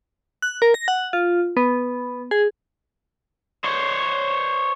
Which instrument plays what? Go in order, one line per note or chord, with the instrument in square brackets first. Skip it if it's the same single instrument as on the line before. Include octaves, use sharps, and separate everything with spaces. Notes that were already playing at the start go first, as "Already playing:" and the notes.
[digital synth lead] F#6
A#4
A#6
F#5
F4
B3
G#4
[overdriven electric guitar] C5 C#5